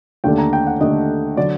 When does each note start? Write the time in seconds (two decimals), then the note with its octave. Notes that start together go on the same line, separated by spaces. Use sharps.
0.24 D#2 D3 A3 D4 G5
0.38 A#5
0.53 G5
0.67 F#5
0.80 D#2 D3 A3 D4 D#5
1.37 D3 F#3 D5